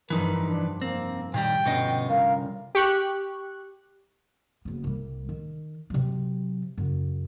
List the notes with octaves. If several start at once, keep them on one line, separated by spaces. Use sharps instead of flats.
F1 G2 E3 D#4 A#4 B4
D4
A#3 C4
A#2 D#3 G3 G#4 G5
G1 B2 B3 C#4 D#5 C7
C2 A#4 F5
G4 C#6 F#6
F#1 B3
C2 G3
D#3
C3 F#3
F#2 C#3